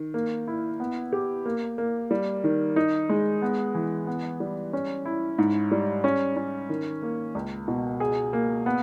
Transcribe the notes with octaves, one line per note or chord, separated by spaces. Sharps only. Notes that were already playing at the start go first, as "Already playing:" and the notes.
Already playing: D#3
A#3
E4
B3
G4
A#3
A#3
G3
D#3
D#4
G#3
B3
E3
B3
G3
C#4
E4
G#2
G3
C#4
C#4
D#3
A#3
C#2
B2
G#4
A#3
B3